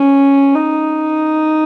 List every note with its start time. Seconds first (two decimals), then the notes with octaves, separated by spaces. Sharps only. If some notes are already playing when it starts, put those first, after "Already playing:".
Already playing: C#4
0.55 D#4